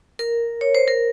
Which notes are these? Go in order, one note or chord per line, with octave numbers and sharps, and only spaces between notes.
A#4
C#5
C5
A#4